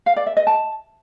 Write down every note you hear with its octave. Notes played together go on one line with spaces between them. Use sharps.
F5
D5
E5
D#5
A5